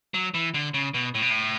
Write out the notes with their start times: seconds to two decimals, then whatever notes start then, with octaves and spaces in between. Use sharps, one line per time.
0.14 F#3
0.34 E3
0.54 D3
0.74 C#3
0.94 B2
1.14 A2
1.22 B2
1.30 A2